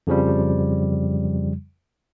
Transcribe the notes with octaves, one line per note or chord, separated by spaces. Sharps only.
F2 C#3 F3 G3